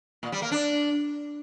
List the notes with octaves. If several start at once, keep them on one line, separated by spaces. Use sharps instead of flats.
A#2
G3
A#3
D4